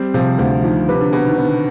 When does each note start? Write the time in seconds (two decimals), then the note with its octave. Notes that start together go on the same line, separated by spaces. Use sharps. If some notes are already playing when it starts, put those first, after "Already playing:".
Already playing: G3 C4
0.14 C3 F3
0.39 D2 F3
0.64 D#3 F3
0.89 C3 B4
1.01 D3
1.13 B2 B4
1.26 D#3
1.38 D3 B3